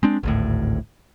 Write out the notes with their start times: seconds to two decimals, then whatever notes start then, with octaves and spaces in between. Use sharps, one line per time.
0.03 G#3 C4 D4
0.23 G#1 D2 A2